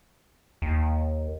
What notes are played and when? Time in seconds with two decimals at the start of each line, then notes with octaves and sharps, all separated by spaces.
0.62 D#2